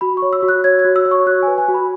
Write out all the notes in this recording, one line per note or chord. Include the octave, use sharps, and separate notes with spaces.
F#4 B5
C#6
C#5
E6
F#4
F#6
C#5 G#6
G#6
F#4
E6
C#5
C#6
F#4 F#6
G#5
B4
G#5
F#4
B5